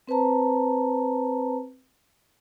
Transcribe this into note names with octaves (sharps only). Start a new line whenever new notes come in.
C4 B4 C5 A5 A#5